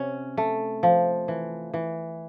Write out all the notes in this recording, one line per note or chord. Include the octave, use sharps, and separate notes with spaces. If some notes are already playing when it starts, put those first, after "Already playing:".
Already playing: C3 C#4
A3
F3
E3
E3